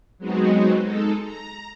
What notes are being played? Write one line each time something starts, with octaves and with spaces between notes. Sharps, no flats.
F#3 G#3 B3 C4 D#4 F#4
G#3 D#4 A4
A#5